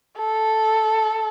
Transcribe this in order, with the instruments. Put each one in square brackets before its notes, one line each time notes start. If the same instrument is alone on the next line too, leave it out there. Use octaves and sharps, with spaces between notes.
[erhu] A4